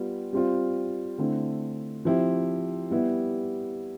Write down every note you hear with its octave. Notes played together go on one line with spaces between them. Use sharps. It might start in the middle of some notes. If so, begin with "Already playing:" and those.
Already playing: G3 B3 F4
G3 C4 F4
D3 A3 C4 E4
F3 C4 E4 G4
G3 B3 E4 G4